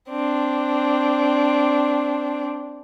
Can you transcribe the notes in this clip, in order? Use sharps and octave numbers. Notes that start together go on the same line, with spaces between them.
C4 D4